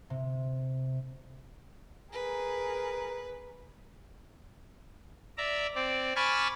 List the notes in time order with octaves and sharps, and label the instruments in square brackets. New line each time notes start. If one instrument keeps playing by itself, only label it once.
[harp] C3
[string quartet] G#4 A#4 [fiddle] B4
[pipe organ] D5 E5 A#5
C4 D5
G#5 A5 B5 C#6 D6 F6